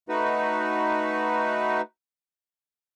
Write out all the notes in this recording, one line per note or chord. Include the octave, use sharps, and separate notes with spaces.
A3 D#4 F#4 B4